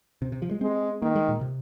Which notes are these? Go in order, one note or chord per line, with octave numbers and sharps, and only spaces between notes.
C3
C3
F3
G#3
G#3 C4
D#3 A#3
G#3
A#2
C3